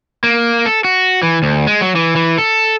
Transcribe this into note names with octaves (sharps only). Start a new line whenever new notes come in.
A#3
A4
F#4
E3
D2
G#3
F#3
E3
E3
A4